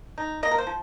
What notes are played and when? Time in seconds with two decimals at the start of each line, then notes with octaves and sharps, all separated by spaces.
0.18 D#4
0.43 A#3 D#5
0.51 A#4
0.58 C5
0.67 F3